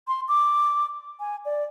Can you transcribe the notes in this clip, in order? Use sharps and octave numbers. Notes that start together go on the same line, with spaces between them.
C6
D6
G#5
D5